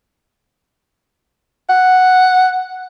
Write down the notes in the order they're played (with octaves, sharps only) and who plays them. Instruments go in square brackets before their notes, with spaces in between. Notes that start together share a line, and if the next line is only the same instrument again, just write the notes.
[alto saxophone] F#5